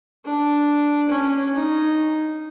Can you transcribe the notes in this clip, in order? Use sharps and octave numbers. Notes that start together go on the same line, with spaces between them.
D4
C#4
D#4